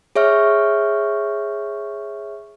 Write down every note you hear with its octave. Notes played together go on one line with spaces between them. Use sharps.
G#4 C#5 E5 C#6 F6